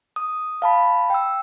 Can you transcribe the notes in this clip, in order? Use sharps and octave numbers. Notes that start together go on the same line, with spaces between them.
D#6
F5 A5 B5
G5 E6